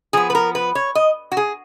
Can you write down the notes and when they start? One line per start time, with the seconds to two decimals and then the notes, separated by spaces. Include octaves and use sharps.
0.13 F3 B3 G#4
0.30 B4
0.35 A#4
0.55 B4
0.75 C#5
0.95 D#5
1.32 F#4
1.37 G#4